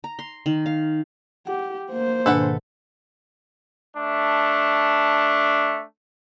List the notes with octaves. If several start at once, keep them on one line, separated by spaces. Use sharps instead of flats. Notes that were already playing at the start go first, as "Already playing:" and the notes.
A#5
C6
D#3
F5
G4 F#5
A#3 C5
G#2 B2 D#3 D4 A4 B4 F#5
A3 D4